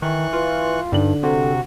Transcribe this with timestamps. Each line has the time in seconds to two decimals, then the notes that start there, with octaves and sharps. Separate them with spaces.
0.02 D#3 E3 C#6 F#6
0.33 F4 B4
0.92 G2 D3 D4 D#4 F#7
1.23 C3 F#4 A4